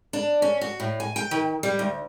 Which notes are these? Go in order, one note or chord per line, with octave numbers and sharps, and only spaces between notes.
D4
C#4
F#4
A2
G#5
G5
D#3
G3
D2